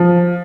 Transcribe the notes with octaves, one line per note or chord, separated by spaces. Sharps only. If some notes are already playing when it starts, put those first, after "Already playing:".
Already playing: F3